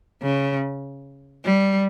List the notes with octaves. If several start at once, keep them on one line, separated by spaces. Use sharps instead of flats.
C#3
G3